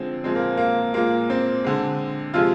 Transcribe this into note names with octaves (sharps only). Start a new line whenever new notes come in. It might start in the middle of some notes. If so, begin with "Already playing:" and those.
Already playing: D3 F3 G#3 C4
A#2 F3 G#3 C4
A#3
A#3
A#2 G#3 A#3
C4
D3 G#3
C3 F3 G#3 F4